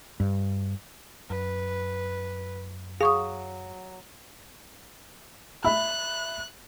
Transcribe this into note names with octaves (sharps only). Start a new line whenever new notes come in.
G2
F#2 B4
F#3 G#4 F5 C#6 D#6
E5 B5 F#6